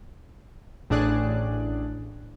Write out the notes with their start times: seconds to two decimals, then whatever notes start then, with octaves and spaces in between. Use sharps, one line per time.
0.90 A1 A2 D4 G#4 D5 F#6